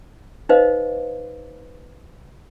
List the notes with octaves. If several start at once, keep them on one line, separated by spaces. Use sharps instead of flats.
D#4 B4 C5 D#5 F5